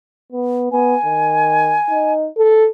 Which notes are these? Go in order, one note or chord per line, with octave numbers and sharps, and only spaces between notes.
B3
B3 G#5
D#3
D#4
A4